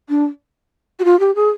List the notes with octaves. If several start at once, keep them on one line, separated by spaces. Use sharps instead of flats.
D4
F#4
F4
G4
G#4